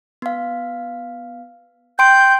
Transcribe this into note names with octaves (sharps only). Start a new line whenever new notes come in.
B3 F5
G5 C6 G6 D7